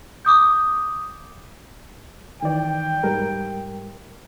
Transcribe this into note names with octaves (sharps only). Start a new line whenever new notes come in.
D6 D#6 G6
D#3 E3 D5 G5
G#2 G3 A#4